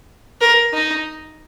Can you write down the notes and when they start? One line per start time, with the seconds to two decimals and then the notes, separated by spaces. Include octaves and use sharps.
0.41 A#4
0.73 D#4